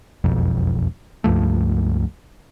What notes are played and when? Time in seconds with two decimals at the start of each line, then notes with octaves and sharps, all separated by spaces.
0.24 E1 B1 F2
1.24 C#2 G2 F3 A3